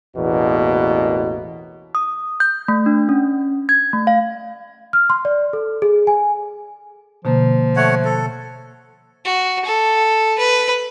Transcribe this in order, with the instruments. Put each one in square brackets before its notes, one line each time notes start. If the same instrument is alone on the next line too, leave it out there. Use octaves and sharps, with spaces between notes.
[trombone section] A1 E2 B2 A#3
[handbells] D#6
G6
A3
D4
C#4
G#6
A3
F5
[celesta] F6
C6
D5
A4
G#4
G#5
[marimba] B2 D3 A#3 [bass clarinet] F3
[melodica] A3 C#5 F#5
A4
[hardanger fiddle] F#4
A4
B4